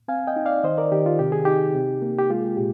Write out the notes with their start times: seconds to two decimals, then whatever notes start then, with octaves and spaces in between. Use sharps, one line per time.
0.08 C4 F5 G#5
0.27 D#5 G5
0.36 D#4
0.45 D5 F5
0.63 D#3 C5 D#5
0.78 A#4 D5
0.92 D#3 G4
1.06 F4
1.19 C3 G4
1.32 G#4
1.45 D#4 G4
1.75 C3
2.02 A#3
2.18 G4
2.30 G#3 F4 G#4
2.57 A#2 G4